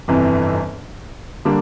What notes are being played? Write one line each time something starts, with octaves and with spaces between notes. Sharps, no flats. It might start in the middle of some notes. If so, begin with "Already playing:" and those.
G1 F2 C3 E3
D3 G3 A#3 D4